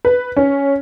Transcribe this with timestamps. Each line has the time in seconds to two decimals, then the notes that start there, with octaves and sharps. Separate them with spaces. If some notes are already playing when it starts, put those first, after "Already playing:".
0.05 B4
0.37 C#4